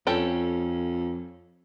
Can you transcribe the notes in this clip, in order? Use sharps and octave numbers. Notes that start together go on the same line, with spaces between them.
F2 C#4 A4 G5